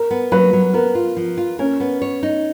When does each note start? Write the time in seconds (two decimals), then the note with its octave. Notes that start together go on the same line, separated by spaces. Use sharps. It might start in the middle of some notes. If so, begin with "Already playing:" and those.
Already playing: A#4
0.11 B3
0.32 F#3 B4
0.53 F#3
0.73 B3 A#4
0.95 F4
1.17 F3
1.38 F4
1.59 C#4 A#4
1.80 B3
2.02 C#5
2.23 D#4